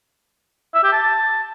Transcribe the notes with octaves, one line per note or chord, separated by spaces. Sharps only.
E5
G4
A5